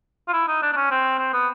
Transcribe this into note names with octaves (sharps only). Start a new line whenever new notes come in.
F4
E4
D#4
D4
D4
C#4
C4
C4
B3